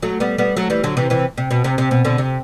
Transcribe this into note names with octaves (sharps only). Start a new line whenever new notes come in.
F#3 A3
G3 B3
G3 B3
F#3 A3
E3 G3
D3 F#3
C3 E3
C3 E3
C3
B2
C3
C3
B2
B2 D3
C3